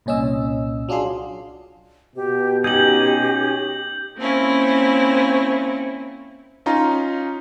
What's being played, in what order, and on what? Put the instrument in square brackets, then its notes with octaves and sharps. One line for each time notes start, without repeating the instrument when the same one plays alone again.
[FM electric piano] C2 A#2 C#4 D#5 E6
F#3 D4 F4 G#4 C6
[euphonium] B2 [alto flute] G4
[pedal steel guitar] C#4 D#4 G#4 [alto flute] G4 [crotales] G6 F#7
[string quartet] A#3 C4 C#4 E4
[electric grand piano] C#4 D#4 F4 F5 A#5